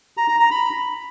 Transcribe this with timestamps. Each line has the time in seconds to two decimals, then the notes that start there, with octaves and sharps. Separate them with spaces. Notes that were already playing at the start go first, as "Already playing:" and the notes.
0.17 A#5
0.29 A#5
0.40 A#5
0.51 B5